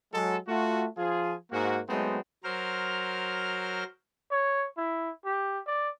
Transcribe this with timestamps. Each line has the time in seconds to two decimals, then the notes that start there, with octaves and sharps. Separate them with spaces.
0.13 F#3 G#3 A4
0.48 A3 F4 F#4
0.98 F3 F4 G#4
1.52 G#2 A#3 F#4
1.89 F#3 G#3 A3 B3 C4 D#4
2.44 F#3 A#4 C5 F6
4.31 C#5
4.77 E4
5.25 G4
5.67 D5